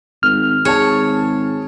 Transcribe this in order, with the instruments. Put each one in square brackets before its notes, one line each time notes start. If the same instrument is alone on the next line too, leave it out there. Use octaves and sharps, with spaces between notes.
[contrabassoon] G#1 [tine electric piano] F6
[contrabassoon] G#1 [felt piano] G#4 A5 [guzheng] C#5